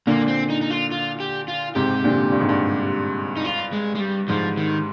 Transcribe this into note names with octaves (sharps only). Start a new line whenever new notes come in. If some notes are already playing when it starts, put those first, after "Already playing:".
A#2 D3 A#3
C4
D#4
D#4
F4
F4
G4
F4
G#2 C3 G4
A#2 D3
G2
G#2
G2
D#4
F4
G#3
G#3
G3
G#2 F3
D#3